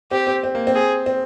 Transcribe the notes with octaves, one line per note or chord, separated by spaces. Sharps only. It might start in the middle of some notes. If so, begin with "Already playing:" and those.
C4 G4
C4
C4
A#3
C4
G#4
C4